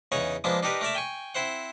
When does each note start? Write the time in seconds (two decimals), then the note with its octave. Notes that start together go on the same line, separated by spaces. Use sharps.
0.12 E2 C#3 D#4 C#5 F#5 C#6
0.44 F3 G#3 A#3 B3 D4
0.63 D4 D#4 G4 A#4 B4
0.81 A3 A#4 D5 E5
0.95 G5 G#5 C#6
1.35 C4 E4 C5 F#5